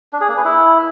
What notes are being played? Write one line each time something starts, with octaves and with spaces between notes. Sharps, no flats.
D4
G#4
A#3
B4
E4